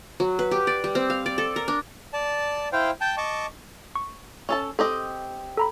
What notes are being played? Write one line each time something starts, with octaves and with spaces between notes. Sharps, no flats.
F#3
B4
G4
D5
G3
C4
F5
D5
A4
A#4
D4
D5 A5
E4 C5 F5 G5
G5 A5 G6
D#5 A5 C#6 D6
C#6
C#4 A4 A5
C4 G4 A4 D#5
A4 A#5 B5